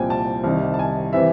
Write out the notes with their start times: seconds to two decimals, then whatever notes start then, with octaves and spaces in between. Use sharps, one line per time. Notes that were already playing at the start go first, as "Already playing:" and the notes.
Already playing: C2 A#2 F3 G5 G#5
0.10 A5
0.44 C2 C3 D#3
0.74 A5
0.79 G#5
1.13 C3 E3 E5